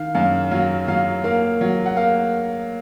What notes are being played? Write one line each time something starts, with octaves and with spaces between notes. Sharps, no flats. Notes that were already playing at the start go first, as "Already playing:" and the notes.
Already playing: D#3 F5
F#2 F5
F#3 F5
F#3 F5
A#3 F5
F#3
F#5
A#3 F5